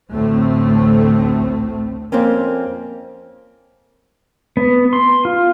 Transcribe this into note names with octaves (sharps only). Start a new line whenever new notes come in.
A1 D2 A2 A3 C4
F2 A#3 C4 C#4
B3
C6
F4